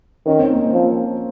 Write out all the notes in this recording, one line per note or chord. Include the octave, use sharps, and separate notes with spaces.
D#3 C#4
C4
A#3
C4
F3